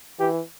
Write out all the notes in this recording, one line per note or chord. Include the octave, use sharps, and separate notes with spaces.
E3 G4